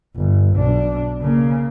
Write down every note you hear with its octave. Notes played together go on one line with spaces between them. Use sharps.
G1
B1 D4
C#3 A#3